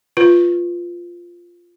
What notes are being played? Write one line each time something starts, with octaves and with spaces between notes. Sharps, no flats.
F4 B4